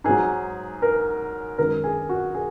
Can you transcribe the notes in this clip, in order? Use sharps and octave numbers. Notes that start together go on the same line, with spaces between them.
G#2 F#3 G#4
A#4
F#2 D#3 G#3 A#4
G#4
F#4
G#4